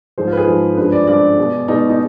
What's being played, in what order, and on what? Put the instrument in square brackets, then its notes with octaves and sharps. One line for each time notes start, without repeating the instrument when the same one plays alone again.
[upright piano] G#2 F3 G#3 C5
F4
B4
G#4
G#2 F3 G#3
G2 F3 G#3 B4
D5
G2 F3 G#3 D5
B2 G#3
B2 G#3 D#4
D#4